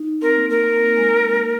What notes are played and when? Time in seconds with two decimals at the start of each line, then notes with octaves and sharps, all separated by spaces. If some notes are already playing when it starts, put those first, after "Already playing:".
Already playing: D#4
0.22 C4 A#4
0.37 A#3
0.50 A#3 A#4
0.64 A#3
0.78 A#3
0.97 G#3
1.14 G#3
1.34 A#3